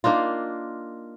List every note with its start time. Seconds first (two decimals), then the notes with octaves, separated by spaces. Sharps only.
0.04 A#3 D4 D#4 F4